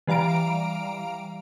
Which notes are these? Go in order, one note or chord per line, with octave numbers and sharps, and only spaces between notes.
E3 G3 F5 A#5 D7